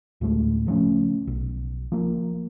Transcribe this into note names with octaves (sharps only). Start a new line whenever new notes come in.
D2 A2 G#3 A3
C#3 F3 A3 C#4
B1
F3 A#3